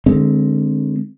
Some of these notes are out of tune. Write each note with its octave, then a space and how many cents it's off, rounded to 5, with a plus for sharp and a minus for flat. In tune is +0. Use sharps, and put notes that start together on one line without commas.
D3 +25 G#3 -5 C4 +0